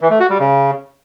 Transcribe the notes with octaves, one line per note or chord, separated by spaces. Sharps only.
E3
A3
F#4
G3
C#3